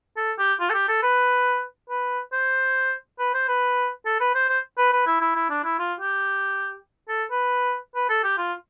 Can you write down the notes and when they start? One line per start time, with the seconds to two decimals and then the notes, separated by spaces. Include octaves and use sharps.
0.17 A4
0.38 G4
0.60 F4
0.70 A4
0.74 G4
0.88 A4
1.03 B4
1.89 B4
2.32 C5
3.19 B4
3.34 C5
3.48 B4
4.05 A4
4.20 B4
4.35 C5
4.49 C5
4.78 B4
4.92 B4
5.06 E4
5.21 E4
5.35 E4
5.50 D4
5.64 E4
5.79 F4
6.00 G4
7.09 A4
7.30 B4
7.95 B4
8.09 A4
8.24 G4
8.38 F4